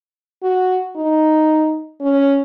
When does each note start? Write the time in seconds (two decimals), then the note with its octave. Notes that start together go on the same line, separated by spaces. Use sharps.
0.43 F#4
0.96 D#4
2.00 C#4